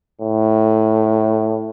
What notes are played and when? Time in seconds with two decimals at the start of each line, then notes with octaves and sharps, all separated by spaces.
0.21 A2